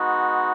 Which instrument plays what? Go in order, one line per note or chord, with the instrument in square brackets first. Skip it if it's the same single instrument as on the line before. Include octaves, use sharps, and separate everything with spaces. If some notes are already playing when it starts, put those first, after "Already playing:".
Already playing: [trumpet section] G#3 B3 D#4 F#4